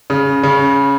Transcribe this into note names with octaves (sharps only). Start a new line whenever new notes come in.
C#3
C#3